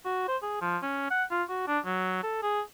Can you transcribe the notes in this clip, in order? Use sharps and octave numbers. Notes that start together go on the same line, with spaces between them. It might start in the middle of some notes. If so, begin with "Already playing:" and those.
F#4
C5
G#4
F3
C#4
F#5
F4
F#4
D4
F#3
A4
G#4